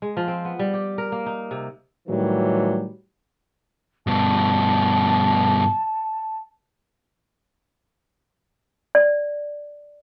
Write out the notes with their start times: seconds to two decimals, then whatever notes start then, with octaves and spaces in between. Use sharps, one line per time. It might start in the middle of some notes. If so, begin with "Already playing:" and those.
0.02 G#3
0.17 F3
0.28 C4
0.45 B3
0.59 G3
0.74 G4
0.98 A#4
1.12 A#3
1.26 D#4
1.51 C3
2.08 A2 D#3 E3 F#3 G3
4.07 G2 B2 A5
8.95 D5